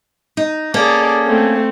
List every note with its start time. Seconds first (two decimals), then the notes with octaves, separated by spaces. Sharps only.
0.37 D#4
0.74 A#3 C#4 G#4 A4 D5
1.27 A3 C4